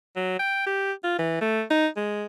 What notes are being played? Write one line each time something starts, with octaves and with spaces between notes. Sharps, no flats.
F#3
G5
G4
F4
E3
A3
D#4
G#3